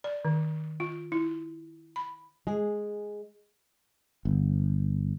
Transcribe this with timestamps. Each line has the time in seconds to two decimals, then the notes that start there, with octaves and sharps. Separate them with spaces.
0.04 D5
0.25 D#3
0.80 F4
1.12 E4
1.96 B5
2.47 G#3 G#4
4.25 G1